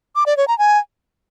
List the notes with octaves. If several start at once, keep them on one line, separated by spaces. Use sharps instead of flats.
D6
D5
C#5
A#5
G#5